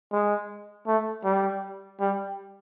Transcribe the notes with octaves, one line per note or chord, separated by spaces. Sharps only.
G#3
A3
G3
G3